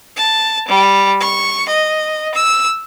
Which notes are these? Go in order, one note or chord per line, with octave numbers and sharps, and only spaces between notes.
A5
G3
C#6
D#5
E6